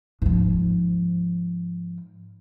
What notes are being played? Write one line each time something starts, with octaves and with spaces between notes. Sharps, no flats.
G#2 F3